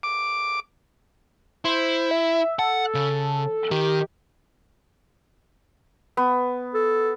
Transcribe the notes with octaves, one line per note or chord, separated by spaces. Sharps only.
D6
E4 C5
E5
A4 F#5
C#3
D#3 G4 A#4
B3
A4